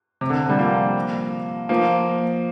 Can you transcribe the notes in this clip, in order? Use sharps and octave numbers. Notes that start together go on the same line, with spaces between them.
C3
D3
D3 G3
F3 A#3
F3 A#3